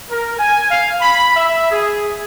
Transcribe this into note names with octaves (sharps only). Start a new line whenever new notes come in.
A#4
G#5
F5
B5
E5
G#4